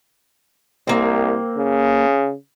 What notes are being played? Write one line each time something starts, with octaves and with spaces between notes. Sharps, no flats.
C2 A#3 C4
C#3